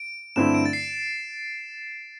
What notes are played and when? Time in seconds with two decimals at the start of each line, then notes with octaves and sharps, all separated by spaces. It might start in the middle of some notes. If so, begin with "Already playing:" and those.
Already playing: D7
0.36 G2 D3 A3 C4 E4 E7
0.54 D7
0.66 A6
0.73 C7